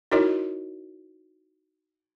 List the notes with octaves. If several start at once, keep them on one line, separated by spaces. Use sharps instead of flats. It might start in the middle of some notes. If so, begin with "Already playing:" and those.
D#4 E4 F#4 A#4 C#5 D#5